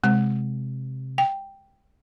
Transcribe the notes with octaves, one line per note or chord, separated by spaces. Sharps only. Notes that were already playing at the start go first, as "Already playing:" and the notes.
C3 G#3
G5